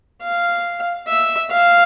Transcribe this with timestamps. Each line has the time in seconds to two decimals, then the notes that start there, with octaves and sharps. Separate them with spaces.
0.22 F5
1.08 E5
1.50 F5